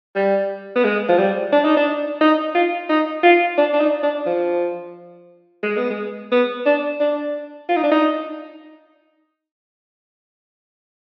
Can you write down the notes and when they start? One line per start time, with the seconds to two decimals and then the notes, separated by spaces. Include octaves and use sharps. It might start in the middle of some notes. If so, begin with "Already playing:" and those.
0.15 G3
0.76 B3
0.84 G#3
1.09 F3
1.18 G3
1.53 D4
1.65 D#4
1.77 D4
2.21 D#4
2.55 F4
2.89 D#4
3.23 F4
3.58 D4
3.73 D4
3.81 D#4
4.03 D4
4.26 F3
5.63 G#3
5.77 B3
5.90 G#3
6.32 B3
6.66 D4
7.00 D4
7.69 F4
7.76 D#4
7.83 D4
7.92 D#4